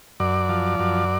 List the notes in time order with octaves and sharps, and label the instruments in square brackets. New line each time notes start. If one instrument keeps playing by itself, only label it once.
[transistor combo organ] F#2 D5
F3
F#2